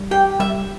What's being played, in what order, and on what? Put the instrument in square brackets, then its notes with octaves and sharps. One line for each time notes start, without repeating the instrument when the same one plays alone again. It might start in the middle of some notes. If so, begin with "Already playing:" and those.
Already playing: [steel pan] G3
[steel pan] G4 [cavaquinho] G5
[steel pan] G3 [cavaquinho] E5